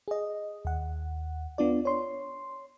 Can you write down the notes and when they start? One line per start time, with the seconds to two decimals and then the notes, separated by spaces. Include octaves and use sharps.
0.08 G#4 D#5
0.65 D#2 F#5
1.58 B3 D4 F4 D5
1.85 C#5 C6